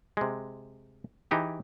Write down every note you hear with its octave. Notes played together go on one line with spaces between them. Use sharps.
C3 G#3
E3 D#4 G4 G#4